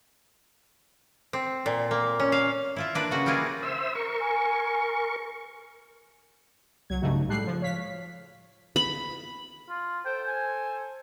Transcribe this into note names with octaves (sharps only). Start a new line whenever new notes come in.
C4
A#2
A#3
C#4
F5
E4 F4 E5
A#3 D4 B4
C#3 F#4
G3 A#3 E4 F4 G#4
C5 E5 E6
A#4 C#6
G#5
C2 F#3 G#6
G2 C#3 F#3 A3 D#4 F#4
A2 G3 G#3 A4 F#6 C7
F3
C#5 F5 B6
B5
F4
A4 C5 G5
G#5